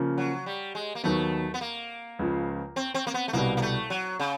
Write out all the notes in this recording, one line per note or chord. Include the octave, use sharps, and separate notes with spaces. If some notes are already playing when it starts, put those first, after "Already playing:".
Already playing: C#3 F3 A#3
F#3
G3
G#3
A#3
D#2 D#3 F#3 A3 B3
B3
A#3
C#2 C#3 F3
C4
C4
A#3
B3
A3
C2 B2 G3 A#3
A#3
A3
F#3
C#3